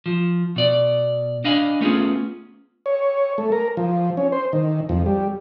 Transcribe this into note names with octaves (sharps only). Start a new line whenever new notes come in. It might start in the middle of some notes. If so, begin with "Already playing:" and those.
F3
B2 D5
D4 D#5 F5 G#5 B5
A3 B3 C#4 F4 G4 G#4
C#5
A3
A#4
F3
C#4
C5
D#3
F2
G3